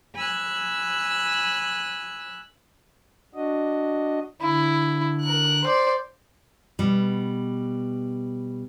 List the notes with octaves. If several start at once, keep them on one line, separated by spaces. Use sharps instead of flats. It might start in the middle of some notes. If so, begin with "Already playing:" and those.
G#5 B5 E6 F#6
D4 F#4 D#5
D3 E4
A#4 F#6
C5 D5
B2 G3